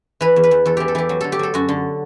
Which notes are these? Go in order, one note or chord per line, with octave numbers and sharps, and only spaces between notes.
E3 B4
E2
B4
E2
E2 A4
E3 G4
A4
E3 G4
F#3
D3 A4
G4
F#3 A4
F#2 F#4
D3